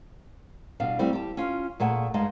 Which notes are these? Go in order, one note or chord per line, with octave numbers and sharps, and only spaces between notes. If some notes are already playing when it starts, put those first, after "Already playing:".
B2 G3 D4 F5
G3 A3 C4 E4
G4 A5
C#4 F4
A#2 A3 G#4 F#5 A5
G2 G#3 D#4 D#5 F5 A5